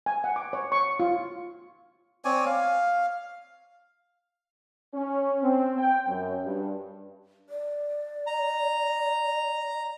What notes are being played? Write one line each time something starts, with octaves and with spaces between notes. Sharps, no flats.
G#5
F#5
D6
C#5
C#6
F4
C4 C#5 D5 G#5
F5
C#4
C4
G5
F#2
G2
D5
A#5